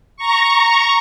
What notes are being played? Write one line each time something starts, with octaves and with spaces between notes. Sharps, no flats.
A#5 C#6